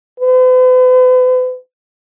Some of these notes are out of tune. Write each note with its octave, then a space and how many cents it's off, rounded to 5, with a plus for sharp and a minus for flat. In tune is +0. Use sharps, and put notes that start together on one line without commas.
B4 +45